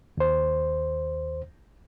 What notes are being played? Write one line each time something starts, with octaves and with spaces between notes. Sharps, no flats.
D#2 C5